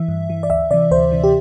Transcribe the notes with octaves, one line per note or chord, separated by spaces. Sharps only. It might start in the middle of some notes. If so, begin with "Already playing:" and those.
Already playing: E3 E5
G2
E3
D5
D2 E5
C3 E3 D5
D2 C5
C3 E3
G4